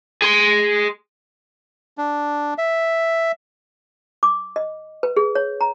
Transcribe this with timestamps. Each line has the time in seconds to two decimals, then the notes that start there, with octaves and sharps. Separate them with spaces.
0.22 G#4 C6
1.98 D4
2.58 E5
4.23 D6
4.56 D#5
5.03 B4
5.17 G#4
5.35 C#5
5.61 A#5